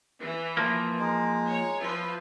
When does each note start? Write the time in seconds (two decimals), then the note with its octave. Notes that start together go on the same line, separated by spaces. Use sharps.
0.19 E3
0.57 F3 A#3
0.99 G#3 D#4
1.47 C#5
1.80 F3 E4 F4 B4